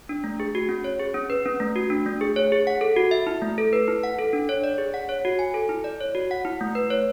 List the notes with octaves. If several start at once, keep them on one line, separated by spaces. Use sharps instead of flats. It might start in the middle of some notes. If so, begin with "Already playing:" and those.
D4
A3
G#4
F#4
C#4
C#5
G#4
C#4
B4
C#4
A3
F#4
D4
A3
G#4
C#5
G#4
F#5
A4
F#4
E5
E4
A3
A4
B4
E4
F#5
A4
D4
C#5
D5
G#4
F#5
C#5
F#4
G#5
A4
E4
D5
C#5
F#4
F#5
E4
A3
B4
C#5